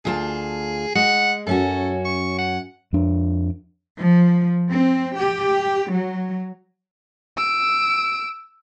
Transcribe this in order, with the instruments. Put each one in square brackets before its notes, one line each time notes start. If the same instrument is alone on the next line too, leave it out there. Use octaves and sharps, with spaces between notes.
[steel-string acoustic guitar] D2 F4 A5 [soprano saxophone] G#4
[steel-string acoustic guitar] G#3 [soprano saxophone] F#5
[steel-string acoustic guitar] F#2 C#4 F#4 [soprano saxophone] A4
[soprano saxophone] C#6
F#5
[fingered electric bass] F2 D4
[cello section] F3
C4
G4
F#3
[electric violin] E6 D7